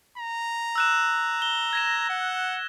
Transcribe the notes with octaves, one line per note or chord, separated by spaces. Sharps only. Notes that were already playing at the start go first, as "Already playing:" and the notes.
A#5
E6 F#6 E7
G7
G#6 A#6 E7
F#5